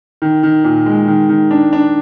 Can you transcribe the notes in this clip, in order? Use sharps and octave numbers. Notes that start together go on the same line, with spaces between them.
D#3
D#3
A#2
G#3
D#3
D#3
D4
D4